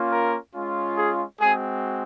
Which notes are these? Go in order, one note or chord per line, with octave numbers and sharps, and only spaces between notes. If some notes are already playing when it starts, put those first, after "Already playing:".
Already playing: A#3 C#4 F4
A#4
G#3 C#4 F4
G#4
G#3 C4 F#4 G#4